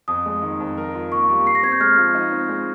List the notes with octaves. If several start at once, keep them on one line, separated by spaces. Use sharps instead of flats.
F2 D#6
G#3
D#3
F2
A#4
F4
A#3 C#6
G3
G4 C7
A#6
C4 G#6
G6
G#3 F6
F3
D#4
C4
G#3